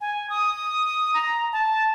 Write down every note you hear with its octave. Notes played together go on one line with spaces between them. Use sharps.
G#5
D#6
A#5
A5